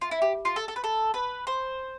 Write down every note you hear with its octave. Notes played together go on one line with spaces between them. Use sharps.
F4
E4
G4
F4
A4
A4
B4
A4
B4
C5